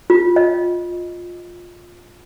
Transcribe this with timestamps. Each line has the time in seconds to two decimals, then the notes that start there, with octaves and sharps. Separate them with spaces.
0.10 F4
0.36 D#5